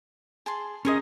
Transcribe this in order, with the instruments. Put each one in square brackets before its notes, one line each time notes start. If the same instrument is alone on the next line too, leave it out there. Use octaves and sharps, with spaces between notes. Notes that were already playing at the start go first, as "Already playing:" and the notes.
[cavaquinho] G#4 A5 C6
[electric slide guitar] C#4 G#4 D#5 [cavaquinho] A#4 C5 D#6